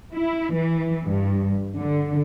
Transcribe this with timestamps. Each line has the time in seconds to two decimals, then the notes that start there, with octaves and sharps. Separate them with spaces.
0.15 E4
0.56 E3
1.07 G2
1.77 D3